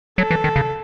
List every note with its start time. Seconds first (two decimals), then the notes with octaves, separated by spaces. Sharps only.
0.18 F#3 A4
0.31 E3
0.44 D#3
0.56 C#3